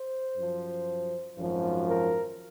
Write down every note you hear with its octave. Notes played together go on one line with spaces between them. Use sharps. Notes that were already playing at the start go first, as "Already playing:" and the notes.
Already playing: C5
F#2 F3
G#1 F#2 F3
A#4